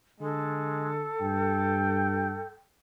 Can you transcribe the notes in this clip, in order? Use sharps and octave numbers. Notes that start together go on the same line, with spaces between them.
D3 G#3 A4
G2 G5